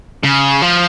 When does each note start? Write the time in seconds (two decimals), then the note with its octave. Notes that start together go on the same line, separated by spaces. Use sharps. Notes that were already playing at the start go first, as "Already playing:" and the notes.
0.24 C#3
0.62 F3